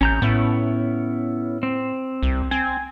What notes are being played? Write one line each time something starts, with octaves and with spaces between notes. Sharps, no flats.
A1 C#4 A#5 G6
A2 B3 C#4 E4
C4
C2
C4 G#5